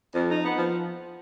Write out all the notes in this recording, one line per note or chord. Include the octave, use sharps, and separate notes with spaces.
F2
D#4
B3
F3